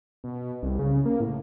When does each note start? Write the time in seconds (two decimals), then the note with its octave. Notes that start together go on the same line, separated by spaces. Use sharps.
0.24 B2
0.63 C2
0.79 C#3
1.06 A#3
1.21 A2